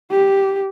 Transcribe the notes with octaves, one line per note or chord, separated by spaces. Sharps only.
G4